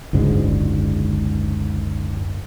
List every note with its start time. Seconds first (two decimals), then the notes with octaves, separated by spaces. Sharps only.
0.13 F#1 C#2 G#2 D3